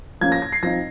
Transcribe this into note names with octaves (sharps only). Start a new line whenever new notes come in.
F3 A#3 C#4 G#6
A#6
A#6
C7
F3 C4 D#4 A#6